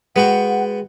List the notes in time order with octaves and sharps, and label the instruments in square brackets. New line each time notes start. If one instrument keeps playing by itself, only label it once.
[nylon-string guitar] G#3 [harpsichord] B3 F#4 G5 [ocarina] F#5